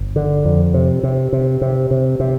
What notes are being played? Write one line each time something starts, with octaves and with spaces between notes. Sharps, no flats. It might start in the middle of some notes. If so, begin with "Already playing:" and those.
Already playing: G1
D3
F2
C3
C3
C3
C3
C3
C3